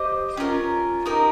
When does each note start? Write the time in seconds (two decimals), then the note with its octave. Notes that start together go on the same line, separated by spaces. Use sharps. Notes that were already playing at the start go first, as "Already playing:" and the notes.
Already playing: G4 C5 D#5
0.37 C#4 F4 A#4
1.06 D#4 G4 A#4 D#5